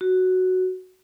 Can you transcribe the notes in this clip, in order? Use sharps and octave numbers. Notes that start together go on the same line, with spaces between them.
F#4